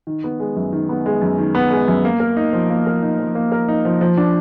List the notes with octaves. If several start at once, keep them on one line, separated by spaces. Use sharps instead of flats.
D#3
B3
G#3
F#2
D#3
B3
G#3
F#2
D#3
B3
G#3
F#2
A#3
A#4
D#4
F3
A#3
A#4
D#4
F3
A#3
A#4
D#4
F3
F3
D4